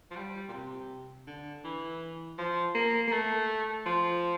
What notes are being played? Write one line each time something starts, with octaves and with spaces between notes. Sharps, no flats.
F3
G3
A#2
C3
D3
E3
F3
A#3
A#3
A3
F3